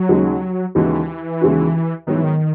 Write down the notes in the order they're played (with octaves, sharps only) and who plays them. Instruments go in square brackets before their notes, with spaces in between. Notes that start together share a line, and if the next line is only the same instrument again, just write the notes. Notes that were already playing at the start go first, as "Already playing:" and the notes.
Already playing: [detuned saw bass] F#3
[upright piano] D#2 C#3 G#3 D#4 F#4
[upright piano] D#2 C#3 G#3 D#4 F#4 [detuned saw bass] E3
[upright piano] D#2 C#3 G#3 D#4 F#4
[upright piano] G#2 F#3 B3 [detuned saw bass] D#3
[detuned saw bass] E3
D#3